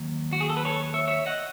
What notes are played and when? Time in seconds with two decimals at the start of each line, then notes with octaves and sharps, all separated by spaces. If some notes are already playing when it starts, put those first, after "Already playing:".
Already playing: D#2 D#3 F#3
0.33 F#4
0.41 G#4
0.50 A4
0.57 B4
0.65 A4 C#5
0.94 C#5 E5
1.08 C#5 E5
1.26 D#5 F#5